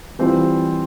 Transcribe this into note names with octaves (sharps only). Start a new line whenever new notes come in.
E3 G3 C4 F4